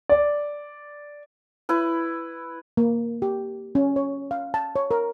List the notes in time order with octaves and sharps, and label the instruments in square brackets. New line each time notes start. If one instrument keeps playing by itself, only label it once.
[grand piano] D5
[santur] E4 B4
[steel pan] A#3
G4
C#4
C#5
F5
A5
C#5
A#4